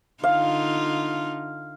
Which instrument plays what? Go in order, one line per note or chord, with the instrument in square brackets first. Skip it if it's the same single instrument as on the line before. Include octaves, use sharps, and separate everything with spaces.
[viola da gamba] D3 D#4 F4 [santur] F5